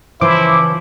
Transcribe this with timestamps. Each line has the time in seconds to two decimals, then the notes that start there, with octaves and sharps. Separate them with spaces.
0.21 C#3 E3 F3 E4 C5 D6